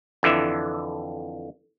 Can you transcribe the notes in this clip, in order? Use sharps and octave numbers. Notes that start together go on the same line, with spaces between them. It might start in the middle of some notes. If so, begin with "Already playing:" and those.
F2 D3 E3 E5